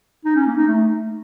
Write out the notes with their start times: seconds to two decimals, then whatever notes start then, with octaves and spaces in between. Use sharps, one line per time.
0.25 D#4
0.36 C#4
0.46 A#3
0.57 D#4
0.68 A3